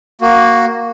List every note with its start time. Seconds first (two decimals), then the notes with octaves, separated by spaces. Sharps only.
0.21 A#3 F#4